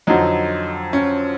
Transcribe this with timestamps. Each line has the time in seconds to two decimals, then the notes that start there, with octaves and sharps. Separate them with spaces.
0.07 F2 D3 F#3 D#4
0.93 C#4